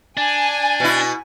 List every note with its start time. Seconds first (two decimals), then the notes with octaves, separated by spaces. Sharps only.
0.17 D4 G#5
0.80 B2 E4